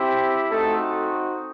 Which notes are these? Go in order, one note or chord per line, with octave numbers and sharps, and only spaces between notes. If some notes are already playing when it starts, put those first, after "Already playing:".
Already playing: C4 E4 G4
A3 C4 D#4 F#4 A4